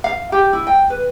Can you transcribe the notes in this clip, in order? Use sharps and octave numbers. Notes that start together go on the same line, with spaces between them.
F5
G4
E4
G5
B4